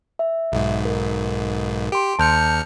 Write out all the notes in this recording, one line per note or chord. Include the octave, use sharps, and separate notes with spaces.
E5
B1 G#2
A#4
G4 C6 D7
D#2 A5 F6 G6 C#7